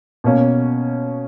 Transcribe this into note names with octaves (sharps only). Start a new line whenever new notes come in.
B2 A#3 C#4